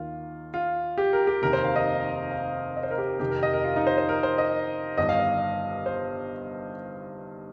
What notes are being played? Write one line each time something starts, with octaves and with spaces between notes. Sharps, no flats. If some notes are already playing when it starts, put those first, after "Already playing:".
Already playing: D#2 D#3 F4
F4
G4
A#4
G4
F1 D#2 D#3 A#4
C5
F5
D#5
F5
D#5
C5
A#4
G4
F1 F2 C3 D#3 G4
A#4
D#5
A#4
F4
D#4
C5
C5
A#4
C5
D#5
G1 G2 D#3 D#5
F5
D#5
C5